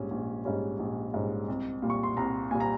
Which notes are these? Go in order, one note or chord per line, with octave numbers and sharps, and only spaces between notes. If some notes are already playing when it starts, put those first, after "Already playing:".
Already playing: A#1 G#2 G3 C#4
A#1
G#2 G3 C#4
A#1
G#2 G3 C#4
C2
A#2 G3
C#6
C6
C2 A#5
A#2 G3 G#5
A#5